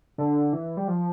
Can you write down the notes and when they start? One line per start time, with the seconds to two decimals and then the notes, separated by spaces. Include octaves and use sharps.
0.18 D3
0.53 E3
0.77 G3
0.88 F3